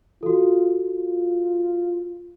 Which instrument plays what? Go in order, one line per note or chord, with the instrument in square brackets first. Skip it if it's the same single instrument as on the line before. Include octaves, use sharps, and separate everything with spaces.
[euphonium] F4 [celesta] F#4 A4
[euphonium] F4